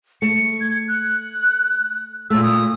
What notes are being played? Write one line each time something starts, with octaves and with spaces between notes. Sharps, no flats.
A3 C#7
G#6
F#6
A#2 A3 E6
D#6